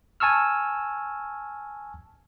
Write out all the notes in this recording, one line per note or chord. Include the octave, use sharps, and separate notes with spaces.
G#5 A5 C#6 E6 F6